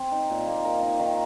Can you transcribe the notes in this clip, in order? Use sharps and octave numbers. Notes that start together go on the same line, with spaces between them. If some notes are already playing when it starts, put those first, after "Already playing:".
Already playing: C4
D#4
A#2
A#3
A#4
D#4
D#3